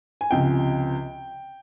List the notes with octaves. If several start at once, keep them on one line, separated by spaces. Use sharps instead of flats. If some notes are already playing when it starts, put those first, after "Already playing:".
G#5
C#2 C3 F3 G5